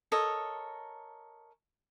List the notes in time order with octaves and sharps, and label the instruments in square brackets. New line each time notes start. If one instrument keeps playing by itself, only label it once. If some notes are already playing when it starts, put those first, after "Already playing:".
[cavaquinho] A4 A#4 C#5 D#5